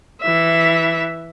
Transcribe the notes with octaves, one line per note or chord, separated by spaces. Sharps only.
E3 E5